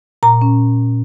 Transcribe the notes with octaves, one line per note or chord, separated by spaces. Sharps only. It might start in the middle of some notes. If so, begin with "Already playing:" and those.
A#2 A#5
C#4